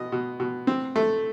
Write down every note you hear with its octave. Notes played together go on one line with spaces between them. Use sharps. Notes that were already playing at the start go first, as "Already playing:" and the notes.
Already playing: B2 D#5
B2
B2
C4
A3